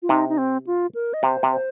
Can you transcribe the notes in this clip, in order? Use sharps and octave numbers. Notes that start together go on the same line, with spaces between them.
F4
C3 D#4
D#4
C4
F4
A#4
D#5
C3 C5
C3
C5